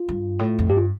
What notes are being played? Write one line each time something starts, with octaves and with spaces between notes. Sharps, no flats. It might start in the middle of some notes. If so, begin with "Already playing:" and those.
Already playing: F4
G2
A2
F2
G2 G4
F4